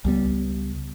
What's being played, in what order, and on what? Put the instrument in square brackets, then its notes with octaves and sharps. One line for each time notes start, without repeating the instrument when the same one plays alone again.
[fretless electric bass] C#2 G3 B3